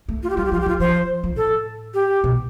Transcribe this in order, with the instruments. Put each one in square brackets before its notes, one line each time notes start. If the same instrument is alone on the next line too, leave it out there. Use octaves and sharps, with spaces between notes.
[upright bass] A3
[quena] F4
G4
[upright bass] G3 [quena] F4
[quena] G4
[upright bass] F3 [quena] F4
[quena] G4
[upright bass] F3 [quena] F4
[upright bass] F3 [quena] C5
[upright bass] F3
[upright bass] A2 [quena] A4
[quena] G4
[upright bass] B2